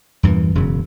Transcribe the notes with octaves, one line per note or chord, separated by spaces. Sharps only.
E2 G2 A#2 E3
E1 F#2 C#3